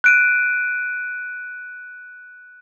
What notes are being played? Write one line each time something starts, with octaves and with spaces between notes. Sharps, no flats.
F#6 D7 D#7